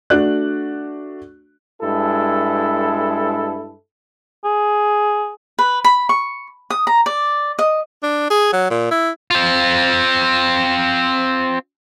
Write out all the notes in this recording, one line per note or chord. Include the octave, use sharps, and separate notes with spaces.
A3 D4 F#4 D5 F#6
G2 G#3 E4 A4
G#4
B4
B5
C#6
D#6
A#5
D5
D#5
D4
G#4
F#3
A#2
E4
C4 F4